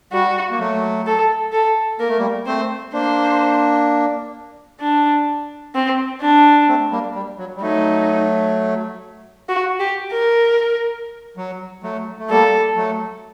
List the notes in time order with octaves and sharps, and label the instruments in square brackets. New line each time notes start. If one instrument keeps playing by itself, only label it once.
[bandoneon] G3 [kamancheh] F#4
[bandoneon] A#3
F#3 A3
[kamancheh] A4
A4
[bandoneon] A#3 [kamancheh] A#4
[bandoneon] A3
G3 A#3
[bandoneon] A3 C4 [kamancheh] C5
[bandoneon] A#3 D4 [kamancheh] C5
[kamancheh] D4
C4
D4
[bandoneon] A3 C4
G3 A#3
G3
F#3
G3
[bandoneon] F#3 A3 [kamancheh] D#4
[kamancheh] F#4
G4
A#4
[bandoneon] F#3
F#3 A3
A3
[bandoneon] G3 A#3 [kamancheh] A4
[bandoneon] F#3 A3